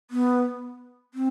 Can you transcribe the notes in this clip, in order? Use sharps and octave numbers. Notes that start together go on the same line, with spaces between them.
B3
C4